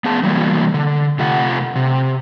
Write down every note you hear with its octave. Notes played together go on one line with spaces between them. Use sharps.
B3 G#4 A5
E3 F#3 G3 A3 A#3
D3
C3 A3 F4 F#5
C3